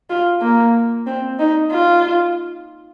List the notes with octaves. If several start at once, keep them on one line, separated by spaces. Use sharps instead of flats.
F4
A#3
C4
D#4
F4